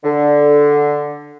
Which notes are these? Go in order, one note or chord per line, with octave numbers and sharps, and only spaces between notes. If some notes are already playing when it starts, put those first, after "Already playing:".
D3